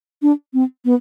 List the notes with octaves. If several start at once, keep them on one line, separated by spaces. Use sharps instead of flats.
D4
C4
B3